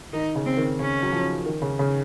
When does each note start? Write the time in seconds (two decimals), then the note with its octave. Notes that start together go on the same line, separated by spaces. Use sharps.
0.13 D#3 D#4
0.35 C#3
0.46 C4
0.57 D#3
0.79 C#3 C#4
1.03 F#3
1.12 F3
1.46 D#3
1.62 C#3
1.79 C#3